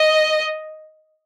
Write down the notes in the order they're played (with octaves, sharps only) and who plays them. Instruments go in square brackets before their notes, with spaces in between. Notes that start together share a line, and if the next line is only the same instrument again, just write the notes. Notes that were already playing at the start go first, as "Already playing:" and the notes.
Already playing: [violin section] D#5